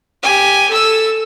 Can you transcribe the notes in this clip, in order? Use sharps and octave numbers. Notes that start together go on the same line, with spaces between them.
G4 G#5
A4 E6